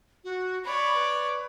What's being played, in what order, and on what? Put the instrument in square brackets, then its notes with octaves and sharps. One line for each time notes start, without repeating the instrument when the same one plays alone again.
[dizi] F#4
[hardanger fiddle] C#5 D5 [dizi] B5
[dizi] B4